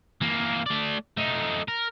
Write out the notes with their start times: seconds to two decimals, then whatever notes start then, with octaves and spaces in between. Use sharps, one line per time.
0.21 E3 A#3
0.66 A3 D5
1.17 A3 D#4
1.68 A#4